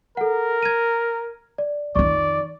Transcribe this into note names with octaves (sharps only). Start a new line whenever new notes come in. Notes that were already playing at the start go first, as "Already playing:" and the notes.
A4 A#4 F#5
G#6 D#7
D5
F2 D#3 D5 C#6